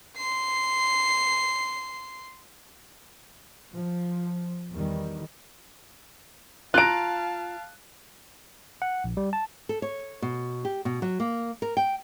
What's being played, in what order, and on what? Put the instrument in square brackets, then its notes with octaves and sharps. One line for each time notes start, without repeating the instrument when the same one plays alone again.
[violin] C6 C7
[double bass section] F3
E2 D#3 G3
[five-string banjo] F4 A#5 [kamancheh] F5 A5 [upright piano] F#6 D7
[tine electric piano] F#5
A#1
G3
A5
[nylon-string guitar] A4
C#5
B2
G4
B2
F#3
A#3
A#4
G5